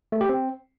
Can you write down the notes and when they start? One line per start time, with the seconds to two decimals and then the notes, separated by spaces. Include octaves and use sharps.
0.12 A3
0.21 G4
0.29 C4